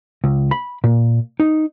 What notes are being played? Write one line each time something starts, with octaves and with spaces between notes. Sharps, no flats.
C#2
B5
A#2
D#4